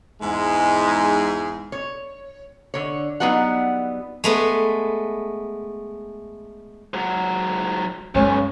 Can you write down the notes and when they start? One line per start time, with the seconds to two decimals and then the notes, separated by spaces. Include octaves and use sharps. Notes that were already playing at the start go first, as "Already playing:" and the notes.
0.22 E2 G#2 G#3
1.72 C#5
2.74 D3 C#5
3.20 F#3 G3 B3 D#4 F#4 F#5
4.24 G#3 A3 B3
6.94 G#2 F#3
8.15 B1 G2 G#3 C#4